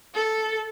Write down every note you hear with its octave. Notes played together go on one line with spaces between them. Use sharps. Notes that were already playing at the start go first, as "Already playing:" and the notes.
A4